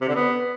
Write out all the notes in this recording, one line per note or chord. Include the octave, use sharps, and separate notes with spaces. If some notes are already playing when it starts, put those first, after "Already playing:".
C3
D3
B3